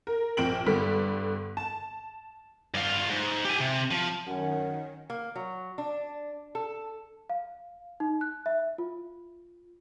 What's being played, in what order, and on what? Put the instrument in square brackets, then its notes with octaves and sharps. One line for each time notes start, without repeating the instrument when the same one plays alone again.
[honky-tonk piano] A#4
A#1 C4 D7 F#7
G2 D3 B3 B6
A5
[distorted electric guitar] G2 F4
G#2
G4 G#5
C3
F3
[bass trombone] F#2 [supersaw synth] D#3 [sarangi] C#4 [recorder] F#5
[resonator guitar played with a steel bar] A#3
F#3
D4
A4
[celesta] F5
D#4
F#6
E5
F4